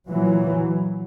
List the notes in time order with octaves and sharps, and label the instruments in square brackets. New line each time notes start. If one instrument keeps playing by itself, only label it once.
[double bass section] A#2 E3 F#3